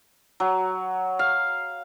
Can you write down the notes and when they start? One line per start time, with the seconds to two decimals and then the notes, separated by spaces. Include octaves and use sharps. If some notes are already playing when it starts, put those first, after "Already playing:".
0.40 F#3
1.19 F5